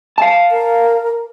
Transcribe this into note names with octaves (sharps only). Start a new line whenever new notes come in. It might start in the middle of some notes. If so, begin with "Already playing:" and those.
F5 A5
A#4